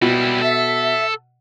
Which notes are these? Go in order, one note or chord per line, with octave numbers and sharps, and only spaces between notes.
B2 G3 E4
A4 E5